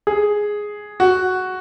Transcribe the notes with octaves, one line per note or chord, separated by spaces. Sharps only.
G#4
F#4